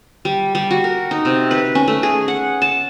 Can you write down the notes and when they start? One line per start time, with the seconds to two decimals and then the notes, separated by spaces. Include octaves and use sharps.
0.25 G3
0.55 G3
0.71 F#4
0.84 A#4
1.11 D#4
1.25 C3
1.51 B4
1.75 C#4
1.88 A3
2.03 G#4
2.28 F#5
2.62 A5